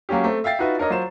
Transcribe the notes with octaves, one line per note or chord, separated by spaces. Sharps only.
F#3 A#3 C#4 G4
A3 C4
E5 F5 G5 A6 C7
D#4 F4 F#4 B4 E5
D4 A#4 C#5 D#5
F#3 F4 C5 E7